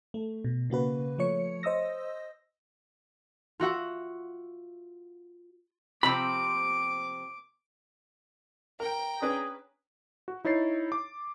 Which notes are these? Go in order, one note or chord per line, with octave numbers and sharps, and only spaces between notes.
A3
B2
C#3 A#3 F#4 B4
F3 A3 C#5 C#7
C5 D#5 D#6 E6 A#6
F4 F#4 E5 F#5
C3 F3 C4 B5 D6
A#4 G5 A#5
C#4 D4 G#4 B4
F#4
D#4 E4 C#5 A6 C7
D6